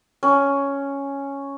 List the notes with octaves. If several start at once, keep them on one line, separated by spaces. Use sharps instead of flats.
C#4